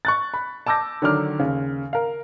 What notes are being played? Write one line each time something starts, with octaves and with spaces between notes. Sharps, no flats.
C#6 F#6 A6
B5
A5 D6 E6 G6 A#6
D3 D#3 F#3 D4 D6 F6
D#2 C#3
A#4 F5